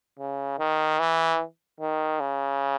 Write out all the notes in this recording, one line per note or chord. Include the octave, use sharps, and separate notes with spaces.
C#3
D#3
E3
D#3
C#3